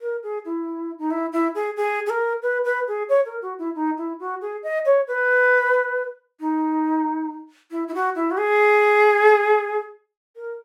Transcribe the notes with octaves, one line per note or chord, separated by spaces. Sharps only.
A#4
G#4
E4
D#4
E4
E4
G#4
G#4
G#4
A#4
B4
B4
G#4
C#5
A#4
F#4
E4
D#4
E4
F#4
G#4
D#5
C#5
B4
D#4
E4
E4
F#4
E4
F#4
G#4
A#4